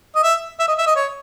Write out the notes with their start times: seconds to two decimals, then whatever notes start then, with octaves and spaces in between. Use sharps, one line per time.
0.15 D#5
0.23 E5
0.59 E5
0.68 D#5
0.78 E5
0.86 D#5
0.96 C#5